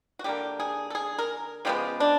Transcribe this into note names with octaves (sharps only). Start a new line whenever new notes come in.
F#4
D3 G3 A#3 G4
G#4
A4
G#4
A#4
C#3 F3 G#3 B3 G4
D4